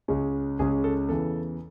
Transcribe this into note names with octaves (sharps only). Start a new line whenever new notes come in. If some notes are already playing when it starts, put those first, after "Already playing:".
C#2 C#3 G#3 C#4
C#2 C#3 G#3 C#4 G#4
A4
E2 C#3 E3 A4